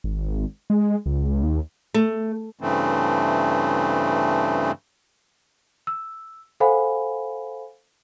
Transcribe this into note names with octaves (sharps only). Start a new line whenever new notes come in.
G#1
G#3
C#2
D#2
A3
G2 C#3 E3 A3 C4
E6
A4 C5 F5 F#5 G#5 B5